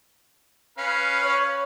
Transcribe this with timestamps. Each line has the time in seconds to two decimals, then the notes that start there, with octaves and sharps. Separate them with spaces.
0.78 C#4 B4 F5
1.23 C#5